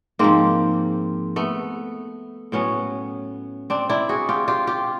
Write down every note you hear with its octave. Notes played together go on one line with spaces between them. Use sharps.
G#2 F3 A#3 C4
A3 B3
A2 F#3 B3 C#4
C4 D4
D4 E4
F#4 G#4
F4 G4
F4 G4
F4 G4